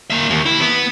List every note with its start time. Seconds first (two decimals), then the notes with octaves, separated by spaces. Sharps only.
0.10 A#3 E5
0.30 D#2
0.46 E4
0.60 B3